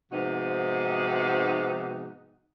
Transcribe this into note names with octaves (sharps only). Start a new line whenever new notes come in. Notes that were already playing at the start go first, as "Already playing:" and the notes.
G#2 C3 F3 B3 D#4 F#4